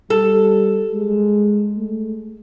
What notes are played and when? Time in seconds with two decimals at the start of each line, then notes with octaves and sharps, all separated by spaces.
0.10 G3 A4
0.94 G#3
1.77 A3